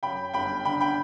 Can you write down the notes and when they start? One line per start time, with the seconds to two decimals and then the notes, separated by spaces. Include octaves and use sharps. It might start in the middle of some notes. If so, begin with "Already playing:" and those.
0.03 F#2 G5 B5
0.34 G1 G5 B5
0.65 D3 G5 B5
0.80 G5 B5